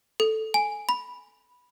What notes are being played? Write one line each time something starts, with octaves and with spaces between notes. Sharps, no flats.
A4
G#5
B5